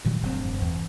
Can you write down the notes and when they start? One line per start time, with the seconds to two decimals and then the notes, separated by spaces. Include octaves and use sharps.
0.05 G2 A#2 D#3 F#3
0.23 F1 G2 C4
0.62 E2